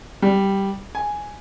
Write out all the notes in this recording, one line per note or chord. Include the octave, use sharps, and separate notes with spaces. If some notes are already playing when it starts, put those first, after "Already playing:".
G3
G#5